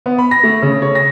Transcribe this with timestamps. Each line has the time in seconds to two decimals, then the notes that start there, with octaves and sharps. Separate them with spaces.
0.06 B3
0.18 B5
0.31 A#6
0.43 A3
0.62 C#3
0.82 C#5
0.95 A#6